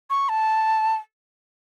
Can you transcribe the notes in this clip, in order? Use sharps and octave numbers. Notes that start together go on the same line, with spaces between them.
C#6
A5